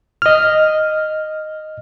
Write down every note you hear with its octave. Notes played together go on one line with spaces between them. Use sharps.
D#5 F6